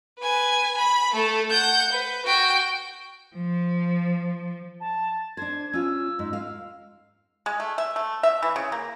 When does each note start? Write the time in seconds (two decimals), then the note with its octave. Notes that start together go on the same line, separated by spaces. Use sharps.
0.20 B4 G#5
0.77 B5
1.14 A3 A4
1.51 F#5 G6
1.92 B4
2.26 F#4 G5
3.36 F3
4.80 A5
5.37 D4 C5 G#6
5.73 C#4 F4 E6
6.19 G#2
6.33 F5
7.46 G#3
7.60 A3
7.78 E5
7.96 A3
8.23 E5
8.43 E3
8.56 C#3
8.72 A#3